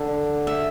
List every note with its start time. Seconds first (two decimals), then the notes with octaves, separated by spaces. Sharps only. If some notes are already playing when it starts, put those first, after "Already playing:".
Already playing: D3
0.47 E5